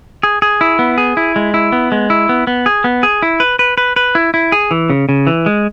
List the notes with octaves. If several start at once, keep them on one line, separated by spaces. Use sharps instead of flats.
G#4
G#4
E4
B3
G#4
E4
G#3
E4
B3
G#3
E4
B3
B3
G#4
B3
G#4
E4
B4
B4
B4
B4
E4
E4
G#4
E3
C#3
C#3
E3
G#3